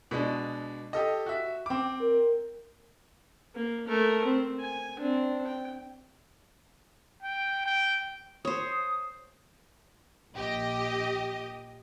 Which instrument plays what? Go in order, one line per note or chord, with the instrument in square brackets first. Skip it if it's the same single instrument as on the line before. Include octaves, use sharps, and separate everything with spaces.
[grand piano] B2 G#3 D4
G4 A4 D#5
F#4 E5
C4 D6
[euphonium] A#4
[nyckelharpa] A#3
A3 A#4
C4
G#5
C4 D4
G5
[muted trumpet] G5
G5
[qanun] C5 C#5 [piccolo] D#6
[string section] A#1 G4 D#5